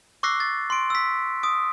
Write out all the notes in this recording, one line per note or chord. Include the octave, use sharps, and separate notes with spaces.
C#6 D6 E6 F#6 A#6 C7
A6
C6 D7
E6 B6
D#6 D7